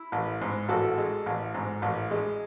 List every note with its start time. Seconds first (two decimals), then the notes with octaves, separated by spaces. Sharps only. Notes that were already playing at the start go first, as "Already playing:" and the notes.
Already playing: E4
0.12 A1
0.41 G#2
0.68 A1 F#4 A4
0.98 G#3
1.26 A1
1.54 G#2
1.82 A1
2.11 G#3